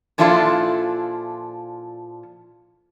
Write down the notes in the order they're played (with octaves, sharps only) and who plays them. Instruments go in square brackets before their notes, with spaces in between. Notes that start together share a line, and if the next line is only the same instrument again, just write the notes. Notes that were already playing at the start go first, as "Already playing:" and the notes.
[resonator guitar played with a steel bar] A#2 F3 D4 E4 F4 A4